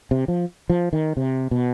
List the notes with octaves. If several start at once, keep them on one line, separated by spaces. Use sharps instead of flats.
C3
F3
F3
D#3
C3
B2